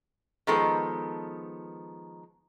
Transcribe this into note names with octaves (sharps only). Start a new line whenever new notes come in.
D#3 F3 G#3 B3 A4